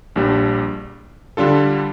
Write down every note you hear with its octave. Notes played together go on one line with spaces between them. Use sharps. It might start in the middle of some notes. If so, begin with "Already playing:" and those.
A#1 A#2 G3 D4
D3 G3 D4 F4 A4